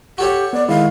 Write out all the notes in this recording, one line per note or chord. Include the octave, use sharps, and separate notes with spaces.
F#4 G4 A4 C#5
B3 D5
D#3 G#3 E4 F5